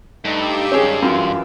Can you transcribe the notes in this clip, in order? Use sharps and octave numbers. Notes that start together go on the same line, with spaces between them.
G2 A3 D#4 G4 D6 E6
D#3 G#3 C#4 G#4
F#2 E3 F4